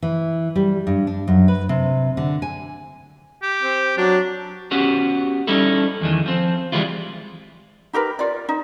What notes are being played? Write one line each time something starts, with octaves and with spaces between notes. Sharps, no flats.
E3
G3
G2
D4
F#2
B4
C3
D3
G#5
G4
C4
F#3 D4
B3 C#4 F#4 G4
G3 C#4 D#4 E4 A4
E2 D#3 E3
F3 C4
E3 G3 G#3 E4 F4
D#4 G4 A#4 B4
F4 D5
D#4